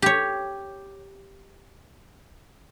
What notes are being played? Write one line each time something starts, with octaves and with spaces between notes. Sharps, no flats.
G4 C#5